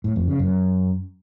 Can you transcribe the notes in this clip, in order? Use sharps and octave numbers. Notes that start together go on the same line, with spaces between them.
A2
F2
C#3
F#2